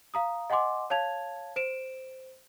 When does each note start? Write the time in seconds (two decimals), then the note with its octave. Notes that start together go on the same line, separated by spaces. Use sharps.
0.14 F5 A#5 D#6
0.50 D#5 F#5 G#5 C6 D6
0.90 C#5 F5 A5 G#6 F7
1.56 C5 D7 E7